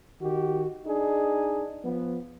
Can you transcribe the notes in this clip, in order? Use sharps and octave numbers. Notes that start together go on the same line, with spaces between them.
D#3 F#4 G4
D4 D#4 G#4
F3 B3